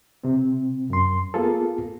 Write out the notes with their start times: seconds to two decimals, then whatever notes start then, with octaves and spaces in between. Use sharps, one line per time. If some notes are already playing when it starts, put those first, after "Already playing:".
0.24 C3 C4
0.90 F#2 C6
1.34 A#3 B3 F4 G#4 A4